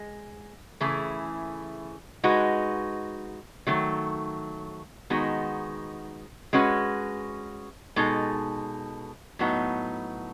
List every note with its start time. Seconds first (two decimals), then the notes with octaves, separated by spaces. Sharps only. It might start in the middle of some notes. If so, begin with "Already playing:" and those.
Already playing: G#3
0.80 C#3 E3 A3 E4 G#4
2.24 G#3 D#4 F#4 B4
3.67 D#3 F#3 A3
5.10 D#3 G#3 B3 D#4 F#4
6.53 G#3 C#4 F#4 B4
7.96 B2 G#3 D#4 A4
9.39 A2 F#3 B3 D#4